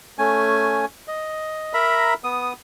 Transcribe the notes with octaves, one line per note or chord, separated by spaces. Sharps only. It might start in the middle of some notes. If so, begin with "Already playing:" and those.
A3 C#4 G#5
D#5
A#4 E5 A#5 B5
B3 D#6